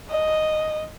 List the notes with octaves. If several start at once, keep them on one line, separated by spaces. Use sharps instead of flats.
D#5